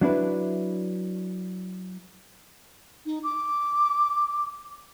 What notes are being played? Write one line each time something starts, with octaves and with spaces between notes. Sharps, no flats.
F#3 D4 E4 B4
D#4
D6